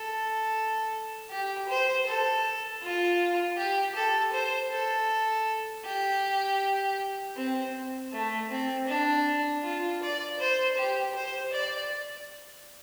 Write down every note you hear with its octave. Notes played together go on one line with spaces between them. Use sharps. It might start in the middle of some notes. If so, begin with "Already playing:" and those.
Already playing: A4
G4
C5
A4
F4
G4
A4
C5
A4
G4
C4
A3
C4
D4
F4
D5
C5
G4
C5
D5